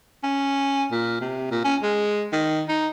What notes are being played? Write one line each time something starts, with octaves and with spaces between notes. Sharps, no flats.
C#4
A#2
C3
A#2
C#4
G#3
D#3
D#4